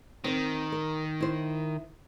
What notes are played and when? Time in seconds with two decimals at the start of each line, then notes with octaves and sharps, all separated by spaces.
0.24 D#3 C4 C5
0.72 A#4
1.21 E4 C5